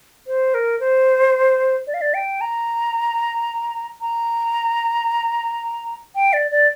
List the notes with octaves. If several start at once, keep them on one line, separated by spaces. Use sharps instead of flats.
C5
A#4
C5
D5
F5
D5
G5
A#5
A#5
G5
D5
D5